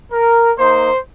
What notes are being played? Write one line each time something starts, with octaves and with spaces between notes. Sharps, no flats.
A#4
A#3 D#4 C5